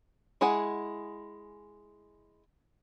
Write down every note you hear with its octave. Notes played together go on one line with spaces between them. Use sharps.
G#3 E4 G#4 F#5 G#5